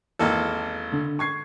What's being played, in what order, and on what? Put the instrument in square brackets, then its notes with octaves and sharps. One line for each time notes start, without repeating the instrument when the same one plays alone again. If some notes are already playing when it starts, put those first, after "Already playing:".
[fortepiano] G#1 A#3 A4 [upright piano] E2
[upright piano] D3
C#6 G#6 C7